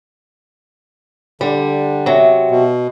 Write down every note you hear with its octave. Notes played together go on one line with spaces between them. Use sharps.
D3 G3
C3 F#3
B2